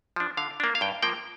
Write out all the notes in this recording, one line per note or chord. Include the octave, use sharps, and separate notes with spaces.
F3 D4
D3 F5
A#3 D4
F5
G2 G5
F3 A#3 G5